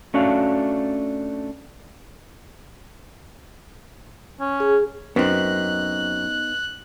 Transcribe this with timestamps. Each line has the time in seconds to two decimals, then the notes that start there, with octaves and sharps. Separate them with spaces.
0.14 A3 C#4 D4 F#4 F5
4.40 C#4
4.60 G#4
5.16 F#2 B3 C4 D#4 F#6